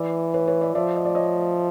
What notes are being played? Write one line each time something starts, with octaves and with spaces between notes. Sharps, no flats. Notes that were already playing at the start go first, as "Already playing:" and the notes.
Already playing: E3 D5 E5
B4 C#5
B4 C#5
D5 E5
F3 D5 E5
D#5
D5
C#5 D#5